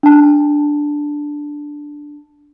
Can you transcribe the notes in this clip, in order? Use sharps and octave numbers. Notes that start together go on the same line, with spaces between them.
D4 A5